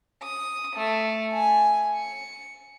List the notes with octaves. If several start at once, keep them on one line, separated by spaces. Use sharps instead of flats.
D#6
A3
G#5
C#7